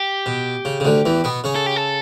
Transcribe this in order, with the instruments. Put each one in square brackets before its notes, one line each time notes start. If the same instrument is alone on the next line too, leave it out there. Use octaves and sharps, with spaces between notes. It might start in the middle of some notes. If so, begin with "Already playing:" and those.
Already playing: [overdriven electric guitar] G4
[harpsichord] B2
C#3
C#3
D2 D3
E2 E3
B2 B3
C#3 C#4
[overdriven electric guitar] A4
G4
A4